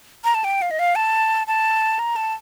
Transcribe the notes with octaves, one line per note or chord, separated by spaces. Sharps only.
A#5
A5
G5
F5
D#5
F5
A5
A5
A#5
A5